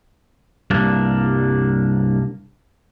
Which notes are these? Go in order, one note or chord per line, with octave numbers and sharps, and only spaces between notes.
C2 G2 A#3 D4